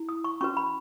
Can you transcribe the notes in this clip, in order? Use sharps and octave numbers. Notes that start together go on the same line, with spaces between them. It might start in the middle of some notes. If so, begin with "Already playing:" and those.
Already playing: E4
D#6
C#6
C#4 F#4 B4 C#6
B5